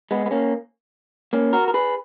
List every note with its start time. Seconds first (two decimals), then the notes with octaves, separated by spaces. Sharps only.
0.11 G#3 B3
0.26 B3
0.31 A#3 C#4
1.33 A#3 C#4
1.53 F#4 A#4
1.68 A#4
1.74 G#4 B4